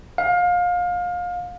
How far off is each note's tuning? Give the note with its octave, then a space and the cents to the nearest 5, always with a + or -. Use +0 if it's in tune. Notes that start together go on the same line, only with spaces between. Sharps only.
F5 +25